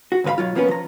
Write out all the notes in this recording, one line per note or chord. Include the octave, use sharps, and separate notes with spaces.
F#4
D2 G#2 B4 F5 B5
B1 F#3 F4
F3 A#3 B3 C#4 B4
F3 A#5